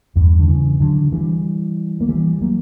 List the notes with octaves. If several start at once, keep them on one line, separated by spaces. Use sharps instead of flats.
E2 G2
D3
C#3 E3
D3 F#3
E3 G3
A#3
E3 G3
F#3 A#3